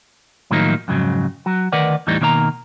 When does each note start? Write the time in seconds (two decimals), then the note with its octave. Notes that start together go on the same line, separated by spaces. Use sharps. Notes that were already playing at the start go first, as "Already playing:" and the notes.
0.51 A2 D#3 F3 F#3 A#3 D#4
0.88 F2 G#2 C#3 F#3
1.46 F#3 F#4
1.72 D2 D#3 A#4 B4 D5 F#5
2.07 E2 A2 E3 G3 D#4
2.21 B2 D#3 A#3 C#5 A#5